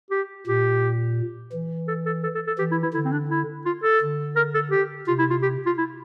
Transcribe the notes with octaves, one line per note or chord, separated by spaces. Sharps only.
G4
A#2 G4
E3
A4
A4
A4
A4
A4
E3 G4
E4
E4
D3 E4
C4
D4
E4
F4
A4
D3
A#4
A4
G4
C3 F4
E4
F4
G4
F4
E4